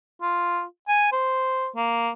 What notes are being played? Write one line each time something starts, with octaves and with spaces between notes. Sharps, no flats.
F4
G#5
C5
A#3